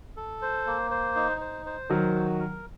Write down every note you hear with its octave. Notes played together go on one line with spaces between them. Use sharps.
A4
C5
A#3
C5
D#4
C5
C5
D#3 F#3 A#4
F#4
A#4